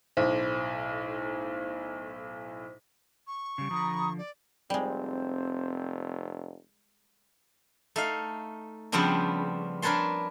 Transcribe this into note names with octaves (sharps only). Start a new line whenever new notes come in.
B1 A2 C5
C#6
C#3 G3
D3 F3 A#5 B5 D#6
D5
F1 G3 G#3 C4
A3 D#4 F5
C#3 F3 G3 B3 C4 D4
D4 A#4 B4 C#5 A5 C6